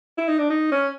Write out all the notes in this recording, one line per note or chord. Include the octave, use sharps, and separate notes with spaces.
E4
D#4
D4
D#4
C#4